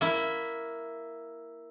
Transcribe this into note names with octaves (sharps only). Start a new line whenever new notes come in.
A#3 E4